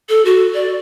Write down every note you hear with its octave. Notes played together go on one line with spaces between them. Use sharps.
A4
F#4
D5